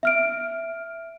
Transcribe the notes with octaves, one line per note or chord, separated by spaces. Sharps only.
E5 F6 D7